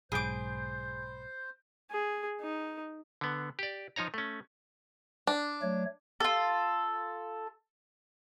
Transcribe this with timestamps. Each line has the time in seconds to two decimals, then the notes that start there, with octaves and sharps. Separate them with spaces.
0.12 B1 G#2 G#4 C5 B5 D6 G6 D7
1.91 G#4
2.41 D#4
3.21 D3 B3
3.59 G4 D5
3.96 F3 D#4 C#5 A#5
4.14 A3 C#4
5.27 D4
5.62 F#3 A3 C#5
6.20 F4 A4